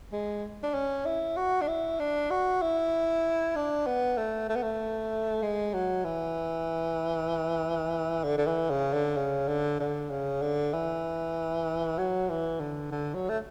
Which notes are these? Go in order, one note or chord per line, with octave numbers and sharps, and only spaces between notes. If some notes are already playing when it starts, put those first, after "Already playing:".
G#3
D4
C#4
E4
F#4
D4
E4
D4
F#4
E4
D4
B3
A3
A3
B3
A3
G#3
F#3
E3
D3
D3
E3
C#3
D3
C#3
D3
D3
C#3
D3
E3
F#3
E3
D3
D3
F#3
A3